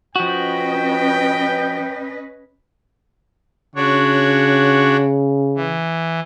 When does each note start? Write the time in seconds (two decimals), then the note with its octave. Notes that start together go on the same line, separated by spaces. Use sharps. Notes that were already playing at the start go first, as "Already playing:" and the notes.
0.16 F3 C#4 F#4 B4 D#5 G5
3.76 C#3 D4 F#4 C#5
5.56 E3